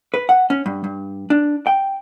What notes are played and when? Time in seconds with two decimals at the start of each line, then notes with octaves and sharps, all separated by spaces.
0.14 B4
0.29 F#5
0.50 C#4
0.66 G2
0.84 G2
1.30 D4
1.67 G5